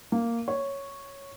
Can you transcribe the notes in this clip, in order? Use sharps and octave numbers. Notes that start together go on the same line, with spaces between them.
A#3
C#5